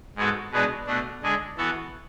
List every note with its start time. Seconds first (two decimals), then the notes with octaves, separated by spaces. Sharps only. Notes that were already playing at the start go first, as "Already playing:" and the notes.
0.16 G#2 G#3 B3 F#4 A4
0.51 B2 G#3 B3 D4
0.87 B2 A3 D4
1.22 D3 G#3 D4 G#4
1.57 E3 B3 F#4 A4